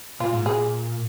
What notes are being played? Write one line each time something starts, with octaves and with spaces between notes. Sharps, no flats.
A#2 F4
G#2
A#2 G#4